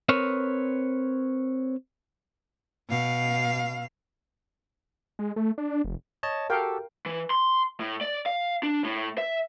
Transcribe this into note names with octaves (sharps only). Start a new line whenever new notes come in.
C4 A#4 B4 C#5
B2 F5
G#3
A3
D4
F1
C#5 D#5 A5
F#4 G4 A4 A#4 F5 G5
E3
C6
A2
D5
F5
D4
A2
E5